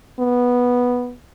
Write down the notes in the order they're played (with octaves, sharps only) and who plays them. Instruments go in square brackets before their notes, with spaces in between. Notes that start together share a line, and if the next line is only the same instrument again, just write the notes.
[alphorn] B3